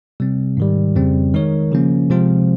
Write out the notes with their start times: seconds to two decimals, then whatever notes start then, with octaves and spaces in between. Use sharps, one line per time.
0.20 C3 G3 C4
0.57 G#2 D#3 G3
0.95 F2 C#3 G3 C4
1.34 D#3 G#3 D#4 A#4 C#5
1.72 C#3 F3 A#3 C#4
2.10 C3 F3 G#3 C4 F4